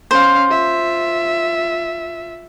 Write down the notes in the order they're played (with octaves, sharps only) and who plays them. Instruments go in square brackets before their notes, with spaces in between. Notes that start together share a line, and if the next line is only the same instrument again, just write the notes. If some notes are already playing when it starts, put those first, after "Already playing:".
[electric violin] C#4 F5 [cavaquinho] C5
[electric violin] F4 E5